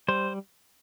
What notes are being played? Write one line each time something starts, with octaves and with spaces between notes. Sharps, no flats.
G3 C5